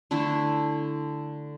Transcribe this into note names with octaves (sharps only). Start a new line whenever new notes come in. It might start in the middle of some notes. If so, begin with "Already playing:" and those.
D3 A3 D4 E4